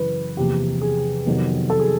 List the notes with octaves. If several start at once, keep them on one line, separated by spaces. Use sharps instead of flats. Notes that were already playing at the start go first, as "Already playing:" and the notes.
Already playing: F#2 C#3 E3 B4
F#1 E2 C3 F3 G4
G#4
F2 C3 D#3 F#3 B3
A4
G#4